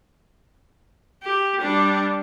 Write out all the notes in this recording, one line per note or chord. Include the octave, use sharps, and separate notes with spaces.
G4
G3 D4